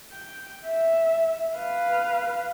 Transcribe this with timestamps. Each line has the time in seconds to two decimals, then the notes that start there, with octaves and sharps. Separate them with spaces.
0.11 G5
0.66 E5
1.56 B4 F5